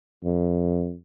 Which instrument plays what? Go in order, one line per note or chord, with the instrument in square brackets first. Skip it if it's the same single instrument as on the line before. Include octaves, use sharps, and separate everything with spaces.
[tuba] F2